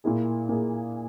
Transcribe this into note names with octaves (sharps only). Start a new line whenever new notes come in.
A#2 A#3 E4 G#4
A#2 A#3 E4 G#4